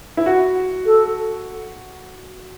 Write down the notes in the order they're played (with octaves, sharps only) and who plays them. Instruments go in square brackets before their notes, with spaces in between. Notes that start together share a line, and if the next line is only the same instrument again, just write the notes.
[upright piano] E4
F#4
[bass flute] A4